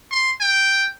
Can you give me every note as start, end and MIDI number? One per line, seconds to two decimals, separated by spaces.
0.11 0.31 84
0.41 0.89 79